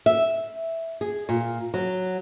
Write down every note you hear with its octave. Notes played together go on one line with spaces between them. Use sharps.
E5
G#4
A#2
F#3